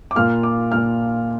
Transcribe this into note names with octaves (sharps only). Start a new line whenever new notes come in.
D6
A#2 A#3 F4 F6
D6
A#2 A#3 F4 F6